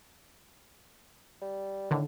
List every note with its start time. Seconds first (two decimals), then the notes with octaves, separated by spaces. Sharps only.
1.41 G3
1.91 A2 D3 D#3